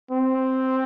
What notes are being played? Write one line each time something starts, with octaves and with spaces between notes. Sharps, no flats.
C4